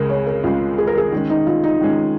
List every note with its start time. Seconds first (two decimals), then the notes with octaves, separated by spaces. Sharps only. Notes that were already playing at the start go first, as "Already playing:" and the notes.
Already playing: C#2 C#3 G#3 G#4 A#4
0.10 C#5
0.27 A#4
0.44 C#2 C#3 G#3 F4
0.78 G#4
0.87 A#4
0.98 G#4
1.12 D#3 G#3 C#4
1.30 D#4
1.47 F4
1.64 D#4
1.80 D#3 G#3 C#4